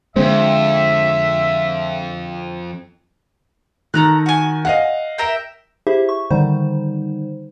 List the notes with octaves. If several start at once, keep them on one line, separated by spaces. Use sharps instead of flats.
F2 D3 G#3 C4 E5
D#3 A4 A#5 F#6
F#4 G#5
D#5 F5 F#5
A#4 E5 G5
E4 G4 G#4 C5 E5
C#6
D3 D#3 G3 D#4 C5